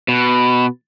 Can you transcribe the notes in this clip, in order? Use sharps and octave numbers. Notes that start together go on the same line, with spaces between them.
B2